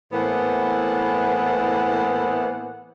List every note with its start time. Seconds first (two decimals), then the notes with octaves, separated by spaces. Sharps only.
0.12 A2 E3 A#3 B3 C5 F#5